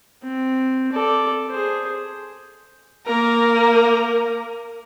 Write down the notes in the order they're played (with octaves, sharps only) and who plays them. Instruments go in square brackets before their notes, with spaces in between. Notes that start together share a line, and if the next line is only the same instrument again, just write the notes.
[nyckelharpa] C4
A4 D5
G#4 C5
[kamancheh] A#3 A#4